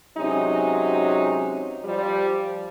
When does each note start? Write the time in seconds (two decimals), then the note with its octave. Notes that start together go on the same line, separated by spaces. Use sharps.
0.18 C3 F#3 G#3 C#4 D#4
1.85 F3 G3